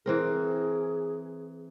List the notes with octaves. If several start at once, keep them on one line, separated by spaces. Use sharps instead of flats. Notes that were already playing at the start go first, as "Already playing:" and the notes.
E3 C4 G#4 A#4